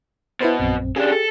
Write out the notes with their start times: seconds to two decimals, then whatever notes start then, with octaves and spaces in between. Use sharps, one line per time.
0.41 B2 E4 B4 C5
0.59 A#1 F#2 C4
0.96 C#3 D4 G4 G#4
1.12 A4